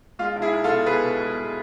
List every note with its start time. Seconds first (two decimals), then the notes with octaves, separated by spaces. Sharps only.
0.19 G#3 F4
0.36 B1
0.42 E4 G#4
0.53 B1
0.64 F4 A4
0.70 B2
0.86 B2 G#4 B4
1.03 B2
1.20 G#3
1.37 G#3